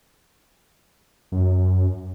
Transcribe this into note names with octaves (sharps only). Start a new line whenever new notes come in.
F#2